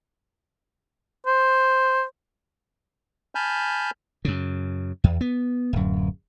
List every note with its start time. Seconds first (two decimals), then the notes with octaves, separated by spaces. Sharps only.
1.27 C5
3.35 G#5 A5 B5 F6 G6
4.25 F#2 C#3
5.04 E2
5.21 B3
5.73 D1 F#2